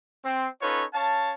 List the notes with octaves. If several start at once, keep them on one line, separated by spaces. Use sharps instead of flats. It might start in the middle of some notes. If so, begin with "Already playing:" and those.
C4
C#4 D#4 F4 A4 B4 C#5
C#4 C#5 F5 A5